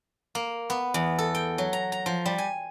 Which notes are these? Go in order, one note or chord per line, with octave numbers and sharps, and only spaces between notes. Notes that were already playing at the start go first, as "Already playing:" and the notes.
A#3
B3
E2
A4
G5
F#3
A#5
A#5
F3
G3
G#5